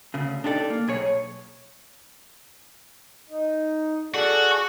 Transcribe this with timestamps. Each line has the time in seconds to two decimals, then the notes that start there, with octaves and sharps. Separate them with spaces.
0.14 D2 C#3
0.44 D4 D#4 G4 A4 D5
0.70 A#3
0.88 B1 G#4 C#5
3.29 D#4
4.14 F#4 G#4 A4 D5